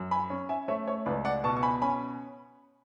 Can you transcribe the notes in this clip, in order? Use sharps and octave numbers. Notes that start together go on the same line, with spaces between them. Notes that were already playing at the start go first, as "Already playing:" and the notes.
Already playing: F#2
G#5 B5
C#4
E5 G#5
A3 C#5 E5
C#5
C#2 B4 D5
D5 F#5
B2 A5 C#6
C#6
G#5 B5
C#4 G#5 B5